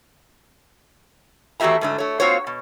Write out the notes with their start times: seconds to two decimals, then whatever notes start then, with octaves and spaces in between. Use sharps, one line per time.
1.60 E2 A3 F#4 G4 E5 A#5
1.81 G#2 D3 A3
1.98 A3 C#5
2.20 A#3 C4 F4 F#4 C5 C#5
2.47 B2